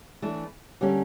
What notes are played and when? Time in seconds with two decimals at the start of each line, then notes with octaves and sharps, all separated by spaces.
0.22 E3 A3 D4
0.81 D3 G3 A#3 C#4